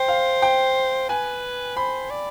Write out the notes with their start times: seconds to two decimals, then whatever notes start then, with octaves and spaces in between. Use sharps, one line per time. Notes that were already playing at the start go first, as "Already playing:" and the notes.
Already playing: C5 G5
0.08 F5
0.42 G5
1.09 B4 G#5
1.77 C5 B5
2.10 D5